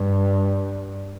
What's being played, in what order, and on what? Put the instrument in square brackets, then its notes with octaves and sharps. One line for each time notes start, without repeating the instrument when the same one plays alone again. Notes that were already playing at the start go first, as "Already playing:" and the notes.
Already playing: [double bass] G2